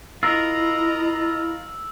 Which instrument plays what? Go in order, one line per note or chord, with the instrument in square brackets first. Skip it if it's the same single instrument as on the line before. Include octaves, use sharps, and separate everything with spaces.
[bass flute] E4 [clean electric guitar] F4 A#4 [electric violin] D#5 A#5 [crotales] E6